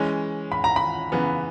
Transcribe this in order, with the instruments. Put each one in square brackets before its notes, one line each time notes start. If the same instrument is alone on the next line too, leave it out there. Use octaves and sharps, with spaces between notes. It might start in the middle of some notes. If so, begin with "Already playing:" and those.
Already playing: [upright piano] E3 G#3 C#4
[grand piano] B5
A#5
B5
[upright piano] C#3 E3 B3